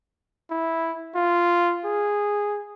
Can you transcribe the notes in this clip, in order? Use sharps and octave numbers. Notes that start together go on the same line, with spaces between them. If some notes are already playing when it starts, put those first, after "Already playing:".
E4
F4
G#4